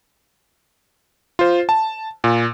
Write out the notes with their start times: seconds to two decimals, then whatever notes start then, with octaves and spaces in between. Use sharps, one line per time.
1.39 F4 C5
1.69 A5
2.24 A#2